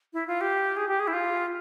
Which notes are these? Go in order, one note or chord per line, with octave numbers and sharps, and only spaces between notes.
E4
F4
G4
G#4
G4
G#4
E4
F4